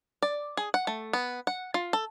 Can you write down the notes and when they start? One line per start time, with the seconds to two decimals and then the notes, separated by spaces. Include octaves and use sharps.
0.22 D5
0.57 G#4
0.74 F#5
0.87 A3
1.13 B3
1.47 F#5
1.74 F4
1.93 A4